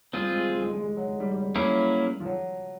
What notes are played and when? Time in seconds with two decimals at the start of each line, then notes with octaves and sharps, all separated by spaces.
0.13 G3 C4 F4 G#4
0.31 G#3
0.49 G#3
0.61 G#3
0.73 G#3
0.84 G#3
0.97 F#3
1.08 G#3
1.20 G3
1.32 G3
1.43 G3
1.56 F#3 A#3 C#4 E4 G#4
2.20 F3
2.25 F#3